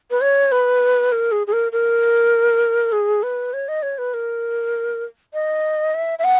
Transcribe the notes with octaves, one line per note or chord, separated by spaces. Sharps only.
B4
C#5
B4
A#4
G#4
G#4
A#4
A#4
G#4
B4
C#5
D#5
C#5
B4
A#4
D#5
E5
E5
F#5